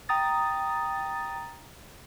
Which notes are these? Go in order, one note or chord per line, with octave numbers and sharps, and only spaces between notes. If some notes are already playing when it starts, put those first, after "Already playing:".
G5 A#5 D#6 A6